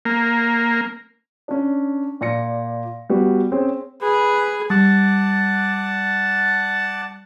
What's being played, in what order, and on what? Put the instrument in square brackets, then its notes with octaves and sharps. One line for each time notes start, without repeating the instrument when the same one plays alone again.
[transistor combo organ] A#3
[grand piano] C#4 D4
A#2 D5 A#6 C#7
G3 B3 F#4
C4 C#4 G#4 C5 C#5
[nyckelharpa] G#4 [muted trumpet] B4
[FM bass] G3 [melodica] D5 F#5 A5